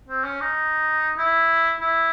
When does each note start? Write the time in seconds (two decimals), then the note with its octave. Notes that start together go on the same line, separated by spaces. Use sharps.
0.09 C4
0.24 C#4
0.41 D#4
1.18 E4
1.81 E4